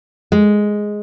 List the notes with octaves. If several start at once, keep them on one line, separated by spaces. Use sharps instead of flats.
G#3